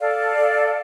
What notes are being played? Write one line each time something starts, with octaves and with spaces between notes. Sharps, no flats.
A4 D5 F5
A4